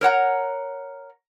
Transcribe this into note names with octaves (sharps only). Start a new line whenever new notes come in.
A#4 C#5 F#5 A#5